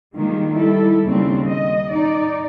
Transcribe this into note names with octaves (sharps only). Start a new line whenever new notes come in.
D#3 F3 G3 G#3 A#3
G3 E4 A4
D#2 C#3 G3 C4
D#5
D#4 D5